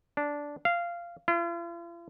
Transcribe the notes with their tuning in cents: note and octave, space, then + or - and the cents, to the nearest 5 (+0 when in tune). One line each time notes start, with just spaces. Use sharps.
D4 -10
F5 -15
F4 -45